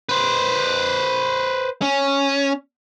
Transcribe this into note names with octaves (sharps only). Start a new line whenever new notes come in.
B4 C5
C#4